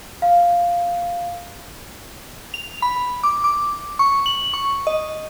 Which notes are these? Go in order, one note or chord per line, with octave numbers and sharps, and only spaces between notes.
F5
F7
B5
D6
D6
C#6
F#7
C#6
D#5